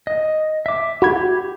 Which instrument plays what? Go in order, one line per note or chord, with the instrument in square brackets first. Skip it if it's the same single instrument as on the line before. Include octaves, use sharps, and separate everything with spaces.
[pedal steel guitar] D#5
E5 D6
[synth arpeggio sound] F#4 B5 G#6 [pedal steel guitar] G4